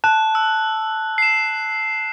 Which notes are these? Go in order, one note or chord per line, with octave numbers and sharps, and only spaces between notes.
A5 F#6
E6
C7 E7